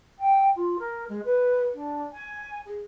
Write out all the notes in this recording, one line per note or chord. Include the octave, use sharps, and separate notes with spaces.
G5
F4
A#4
G#3
B4
D4
G#5
G#4